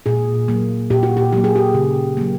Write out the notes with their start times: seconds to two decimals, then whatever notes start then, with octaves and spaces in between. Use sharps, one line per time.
0.06 A#2 G#4
0.48 F#3 A#3
0.90 A#2 G4
1.03 F#4
1.17 G4
1.32 F#3 A#3 G4
1.44 G#4
1.56 G4
1.75 C#3
2.17 F#3 A#3